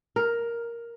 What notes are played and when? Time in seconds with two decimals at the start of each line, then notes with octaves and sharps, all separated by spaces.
0.16 A#4